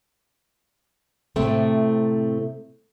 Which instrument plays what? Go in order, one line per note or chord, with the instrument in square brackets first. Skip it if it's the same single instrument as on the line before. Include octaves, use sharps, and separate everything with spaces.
[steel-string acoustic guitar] A2 C3 A3 C4